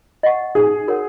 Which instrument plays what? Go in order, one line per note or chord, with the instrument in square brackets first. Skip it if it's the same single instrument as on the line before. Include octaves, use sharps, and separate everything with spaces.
[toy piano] D#5 F#5 C#6
[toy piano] D#4 [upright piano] G#4
[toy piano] F#4 A#4 C#5 F#5